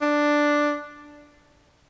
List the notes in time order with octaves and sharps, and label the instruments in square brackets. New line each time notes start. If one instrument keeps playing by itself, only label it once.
[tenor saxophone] D4